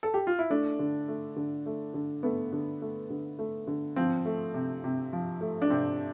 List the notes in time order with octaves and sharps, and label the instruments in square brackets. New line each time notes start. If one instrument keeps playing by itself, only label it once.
[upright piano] A4
G4
F4
E4
A3 D4
D3
A3
D3
A3
D3
A3 B3
D3
A3
D3
A3
D3
F3 C4
A3
C3
C3
F3
A3
D4
C3 C4